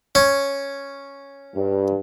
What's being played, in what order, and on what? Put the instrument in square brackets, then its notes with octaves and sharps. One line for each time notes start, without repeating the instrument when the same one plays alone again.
[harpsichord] C#4
[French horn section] G2